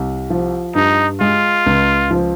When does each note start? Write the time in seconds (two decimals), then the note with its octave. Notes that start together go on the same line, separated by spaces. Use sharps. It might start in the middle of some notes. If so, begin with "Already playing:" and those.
Already playing: C2
0.30 F3
0.75 G2 D#4
1.20 G#3 F4
1.66 C#2
2.11 F3